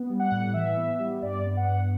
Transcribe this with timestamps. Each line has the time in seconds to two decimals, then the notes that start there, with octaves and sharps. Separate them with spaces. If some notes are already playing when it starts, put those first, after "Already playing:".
Already playing: B3
0.09 G3
0.19 F#5
0.31 A2
0.54 E3 E5
0.77 B3
0.99 G3
1.22 G2 D5
1.45 B3
1.57 F#5
1.68 G2